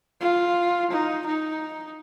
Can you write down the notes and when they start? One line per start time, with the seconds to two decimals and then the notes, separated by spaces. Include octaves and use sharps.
0.21 F4
0.91 D#4
1.26 D#4